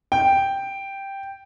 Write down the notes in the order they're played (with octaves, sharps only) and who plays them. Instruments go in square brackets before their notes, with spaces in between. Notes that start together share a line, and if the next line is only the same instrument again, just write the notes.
[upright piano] G5